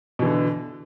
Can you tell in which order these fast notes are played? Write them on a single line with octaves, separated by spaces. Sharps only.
B2 E3 D3